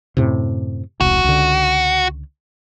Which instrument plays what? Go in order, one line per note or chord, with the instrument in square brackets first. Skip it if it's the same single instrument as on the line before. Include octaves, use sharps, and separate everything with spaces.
[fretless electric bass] F#2 A2 C3
[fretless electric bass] E1 C2 [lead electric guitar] F#4
[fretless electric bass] C#2 D3